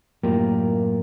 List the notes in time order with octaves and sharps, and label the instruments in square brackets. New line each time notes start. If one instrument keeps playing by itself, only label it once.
[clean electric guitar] F#2 A2 A#3 F4 G4 A#4